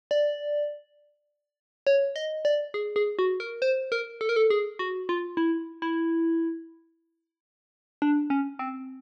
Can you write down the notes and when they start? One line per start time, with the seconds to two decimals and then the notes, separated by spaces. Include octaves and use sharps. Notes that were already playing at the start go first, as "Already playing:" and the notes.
0.11 D5
1.87 C#5
2.16 D#5
2.45 D5
2.74 G#4
2.96 G#4
3.19 F#4
3.40 A#4
3.62 C5
3.92 A#4
4.21 A4
4.29 A#4
4.36 A4
4.50 G#4
4.79 F#4
5.09 F4
5.37 E4
5.82 E4
8.02 D4
8.30 C#4
8.59 C4